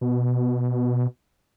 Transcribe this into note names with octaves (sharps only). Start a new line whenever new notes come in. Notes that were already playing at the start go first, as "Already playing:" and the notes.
B2